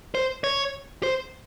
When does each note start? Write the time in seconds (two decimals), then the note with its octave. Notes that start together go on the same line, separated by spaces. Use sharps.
0.15 C5
0.44 C#5
1.03 C5